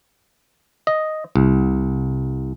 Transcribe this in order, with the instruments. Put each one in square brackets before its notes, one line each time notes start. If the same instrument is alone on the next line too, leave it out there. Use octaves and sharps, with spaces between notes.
[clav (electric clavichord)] D#5
C2